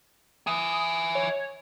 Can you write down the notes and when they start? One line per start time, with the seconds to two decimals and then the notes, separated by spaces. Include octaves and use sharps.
0.47 E5 G#5 D#6
1.15 C#5